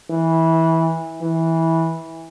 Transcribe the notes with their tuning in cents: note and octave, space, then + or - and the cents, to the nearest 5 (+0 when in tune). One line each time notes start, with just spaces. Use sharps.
E3 -15
E3 -15